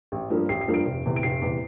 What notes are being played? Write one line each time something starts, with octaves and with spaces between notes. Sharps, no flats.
A1
G2 F3 A#3
A1 C7
C7
G2 F3 A#3
D7
F1
E2 C3
D7
F1 C7
E2 C3